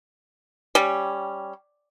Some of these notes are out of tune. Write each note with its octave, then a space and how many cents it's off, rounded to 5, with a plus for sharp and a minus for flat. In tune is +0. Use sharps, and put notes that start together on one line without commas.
G3 +0 C#4 +0